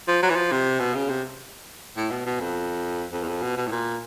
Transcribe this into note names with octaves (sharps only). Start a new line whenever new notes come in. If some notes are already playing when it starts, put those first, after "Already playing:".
F3
F#3
E3
F3
C3
B2
C#3
C3
A2
B2
B2
F2
F2
E2
F2
B2
B2
A2
A#2